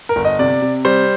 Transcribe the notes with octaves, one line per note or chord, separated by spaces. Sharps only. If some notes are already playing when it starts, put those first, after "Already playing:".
A#4
G1
D#5
C3 D5
C3
G3 C5